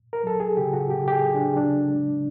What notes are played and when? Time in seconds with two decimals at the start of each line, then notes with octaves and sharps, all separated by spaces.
0.13 A#4
0.24 F#3 A4
0.40 G#4
0.57 C#3 G4
0.73 F#4
0.90 C#3 G4
1.08 G4
1.12 G#4
1.23 F#3
1.34 D4
1.56 C#3 D4
1.90 G#3